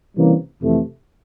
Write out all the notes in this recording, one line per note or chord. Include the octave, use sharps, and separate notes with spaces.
C3 E3 G3 A#3 C#4
F2 C3 E3 A3